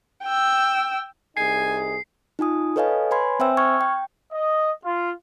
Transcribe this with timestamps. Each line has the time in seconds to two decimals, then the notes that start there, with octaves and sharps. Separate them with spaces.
0.24 G5 E6
1.37 C2 D#4 G#4 G#5 C7
2.39 D#4 F4 G#5 D#6
2.76 A4 B4 C#5 D#5 F5 G#5
3.11 B4 C#5 G#5 B5 C6 G#6
3.39 C4 C5 E5 G5 G#5 E6
3.57 C#6 F6 G#6
3.81 G5
4.32 D#5
4.84 F4